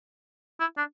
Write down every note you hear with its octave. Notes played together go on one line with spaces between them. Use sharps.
E4
D4